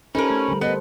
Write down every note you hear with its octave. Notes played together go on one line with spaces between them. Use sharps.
C#4 D#4 G4 A4 A#4 C5 B5
A3
D3 G3
B3 A#4 C5 D#5